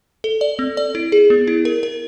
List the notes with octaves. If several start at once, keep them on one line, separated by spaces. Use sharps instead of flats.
A4
D5
C4
D5
E4
G#4
B3
E4
A#4
A#4